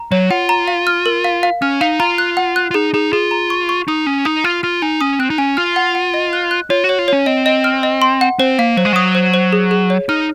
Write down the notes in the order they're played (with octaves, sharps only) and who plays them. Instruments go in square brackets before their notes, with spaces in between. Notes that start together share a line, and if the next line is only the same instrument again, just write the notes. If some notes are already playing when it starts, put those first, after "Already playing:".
Already playing: [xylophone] A#5
[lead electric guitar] F#3 [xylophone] C#5
[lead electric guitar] F4 [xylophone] F#5
[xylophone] A#5
F5
F6
A#4
F5
F5
[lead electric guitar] C#4 [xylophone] F6
[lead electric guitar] D#4 [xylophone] F5
[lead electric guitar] F4 [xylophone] A#5
[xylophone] F#6
F#5
F#6
[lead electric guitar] F4
[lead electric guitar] D#4 [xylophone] G#4
[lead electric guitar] D#4 [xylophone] G#4
[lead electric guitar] F4 [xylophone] G#4
[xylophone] A#5
C#6
C#6
[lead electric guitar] D#4 [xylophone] D#6
[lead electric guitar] C#4 [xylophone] D#6
[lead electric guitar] D#4 [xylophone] D#6
[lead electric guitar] F4 [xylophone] F6
[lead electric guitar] F4 [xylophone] F6
[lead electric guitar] D#4 [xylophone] G#5
[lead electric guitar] C#4 [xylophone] D#6
[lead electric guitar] C4 [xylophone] F#6
[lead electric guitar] D#4
[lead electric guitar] C#4 [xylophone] G#5
[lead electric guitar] F4 [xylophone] F6
[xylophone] F#5
F#5
D#5
F#6
F#6
[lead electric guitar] F4 [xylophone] C#5
[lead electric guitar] F#4
[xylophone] C#5
[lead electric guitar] F4
[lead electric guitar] C#4 [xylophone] C#5
[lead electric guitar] C4 [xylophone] D#5
[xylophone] D#5
F6
D#5
C6
F#5
[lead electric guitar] C4 [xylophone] C5
[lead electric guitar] A#3 [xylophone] F5
[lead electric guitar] F#3 [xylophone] C5
[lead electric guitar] G#3
[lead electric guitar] F#3 [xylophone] D#6
[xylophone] C5
C5
G#4
G#4
C#5
[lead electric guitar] D#4 [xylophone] F6